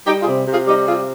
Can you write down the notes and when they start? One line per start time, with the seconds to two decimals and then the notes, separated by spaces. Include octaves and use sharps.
0.06 G3 D#4 G4
0.21 F4 G#4
0.27 C3
0.47 C3 F4 G#4
0.66 G3 D#4 G4
0.87 C3 F4 G#4